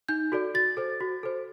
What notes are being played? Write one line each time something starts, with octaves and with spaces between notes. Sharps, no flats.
D#4 G6
F#4 A4 D5
F#4 A6
A4 C5
F#4
A4 C5